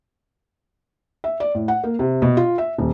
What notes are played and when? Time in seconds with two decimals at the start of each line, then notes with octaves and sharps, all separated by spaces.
1.24 E5
1.40 D5
1.55 A2
1.68 F#5
1.84 A#3
1.99 C3
2.22 B2
2.37 F4
2.58 E5
2.78 D#1